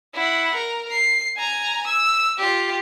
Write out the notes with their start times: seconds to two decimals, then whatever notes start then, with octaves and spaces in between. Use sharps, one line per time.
0.14 E4 F#5
0.55 A#4
0.91 C7
1.36 G#5 A#5
1.87 E6
2.38 F4 G4